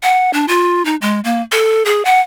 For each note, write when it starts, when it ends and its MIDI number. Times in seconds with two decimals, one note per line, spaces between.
0.03 0.30 78
0.33 0.45 62
0.48 0.85 65
0.85 0.96 63
1.02 1.20 56
1.24 1.42 58
1.52 1.83 69
1.85 2.04 68
2.05 2.20 78